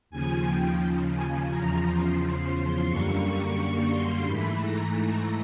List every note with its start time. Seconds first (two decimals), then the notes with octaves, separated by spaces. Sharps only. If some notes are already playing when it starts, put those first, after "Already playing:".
0.10 D#2 C#3 F3 G#5
0.45 G5
1.14 G#5
1.49 E2 C#3 F3 A#5
1.83 C6
2.87 F#2 D3 G3 A#3 C#6
3.91 C6
4.25 G#2 E3 A3 B5
4.60 A#5
4.94 A#5